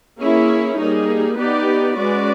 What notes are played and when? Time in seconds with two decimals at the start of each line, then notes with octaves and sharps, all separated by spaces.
0.21 A#3 C#4 E4 G#4 C#5
0.79 G3 A#3 D#4 G#4
1.38 B3 D#4 G4 B4 D5
1.97 G#3 C#4 F#4 B4 D5